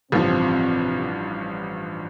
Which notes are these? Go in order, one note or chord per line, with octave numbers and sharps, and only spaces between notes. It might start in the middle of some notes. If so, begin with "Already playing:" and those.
A1 G2 C3 F3 C4